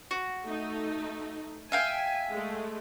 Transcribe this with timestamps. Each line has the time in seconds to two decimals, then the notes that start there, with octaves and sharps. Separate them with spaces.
0.11 F#4
0.45 A3 D#4
1.72 E5 F5 G5 G#5
2.30 G#3 A3